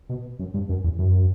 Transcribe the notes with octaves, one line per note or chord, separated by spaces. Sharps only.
B2
F#2
G2
F#2
E2
F#2